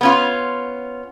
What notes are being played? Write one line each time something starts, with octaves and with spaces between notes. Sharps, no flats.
B3 C#4 F4